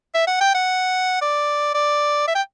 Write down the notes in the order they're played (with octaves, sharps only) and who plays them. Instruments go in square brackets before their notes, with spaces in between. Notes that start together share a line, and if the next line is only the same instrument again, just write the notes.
[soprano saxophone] E5
F#5
G5
F#5
D5
D5
E5
G5